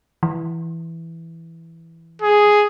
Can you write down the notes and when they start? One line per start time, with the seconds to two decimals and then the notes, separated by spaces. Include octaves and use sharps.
0.23 E3
2.22 G#4